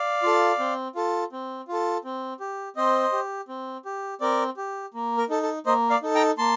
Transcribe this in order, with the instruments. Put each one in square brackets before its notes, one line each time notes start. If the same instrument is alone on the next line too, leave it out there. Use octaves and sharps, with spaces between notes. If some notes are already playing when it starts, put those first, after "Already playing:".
Already playing: [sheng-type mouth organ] D5 F5
F4 A4
C4
F4 A4
C4
F4 A4
C4
G4
C4 C5 D#5
G4
C4
G4
C4 A#4 D5
G4
A#3
A#4
D#4 A4
A4
A#3 C5 D#5
D5 F5
D#4 A4
G5 A#5
A#3 A5 C6